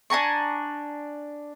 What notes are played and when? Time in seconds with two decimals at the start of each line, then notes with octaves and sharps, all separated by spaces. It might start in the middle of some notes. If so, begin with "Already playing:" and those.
0.10 D4 G#5 A#5 C#6